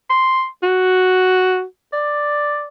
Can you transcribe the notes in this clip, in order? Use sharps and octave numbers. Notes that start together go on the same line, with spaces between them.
C6
F#4
D5